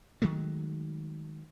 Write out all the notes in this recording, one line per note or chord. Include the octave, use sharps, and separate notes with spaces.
D#3 F#3 G#3 A3